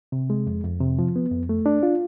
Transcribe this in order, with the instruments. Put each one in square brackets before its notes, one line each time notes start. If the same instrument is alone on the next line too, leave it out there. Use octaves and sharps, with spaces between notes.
[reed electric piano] C3
G#3
F2
F2
C3
F3
B3
F2
A3
D4
F4